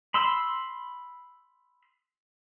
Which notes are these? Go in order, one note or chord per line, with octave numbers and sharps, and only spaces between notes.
B5 C6 E6